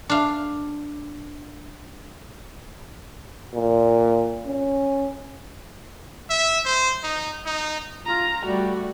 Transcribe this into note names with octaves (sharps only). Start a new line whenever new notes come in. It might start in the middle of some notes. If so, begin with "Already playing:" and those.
D4 F5
A#2
C#4
E5
C5
D#4
D#4
F4 A#5
G3 A3 F#4